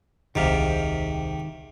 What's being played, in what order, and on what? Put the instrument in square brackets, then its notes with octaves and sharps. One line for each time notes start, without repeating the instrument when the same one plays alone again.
[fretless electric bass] D#1 C2 [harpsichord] G#2 C3 [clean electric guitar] D#3 G4 F5